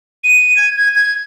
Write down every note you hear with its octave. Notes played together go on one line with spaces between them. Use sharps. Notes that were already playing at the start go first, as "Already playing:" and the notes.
D#7
G#6
G#6
G#6